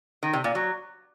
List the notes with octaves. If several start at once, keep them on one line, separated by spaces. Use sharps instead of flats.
D#3
C3
A#2
F#3